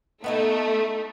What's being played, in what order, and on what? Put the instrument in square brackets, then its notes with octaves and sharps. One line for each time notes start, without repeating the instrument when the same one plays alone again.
[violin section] A3 [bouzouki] B3 D#4 E4